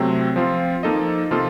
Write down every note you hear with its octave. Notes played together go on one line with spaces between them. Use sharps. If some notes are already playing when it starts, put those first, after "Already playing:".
Already playing: C3 F#3 A3 C4
F3 C4 F4
F3 A#3 D#4 A4 D#5
C3 F3 A#3 F4 A4